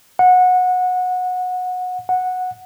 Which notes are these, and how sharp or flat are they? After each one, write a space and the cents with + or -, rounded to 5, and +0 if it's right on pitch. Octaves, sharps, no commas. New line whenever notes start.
F#5 -20
F#5 -10